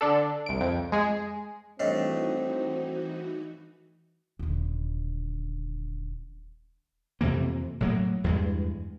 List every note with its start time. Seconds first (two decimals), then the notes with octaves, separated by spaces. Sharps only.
0.01 D3 D4 A4
0.46 C2 D7
0.61 F2
0.92 G#3 G#4
1.80 G2 E3 A3 C4 D#4 F#4 C#5 D#5
4.39 D#1 D3
7.21 F2 C3 E3 A#3
7.81 A2 F#3 A#3
8.24 E2 G2 G#3